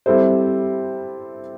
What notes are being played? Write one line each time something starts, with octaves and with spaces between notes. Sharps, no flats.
G3 C4 E4 A4 C5